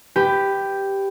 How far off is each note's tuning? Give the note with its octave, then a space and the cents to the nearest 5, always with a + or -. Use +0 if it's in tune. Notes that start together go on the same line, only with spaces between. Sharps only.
G4 +0 B4 +15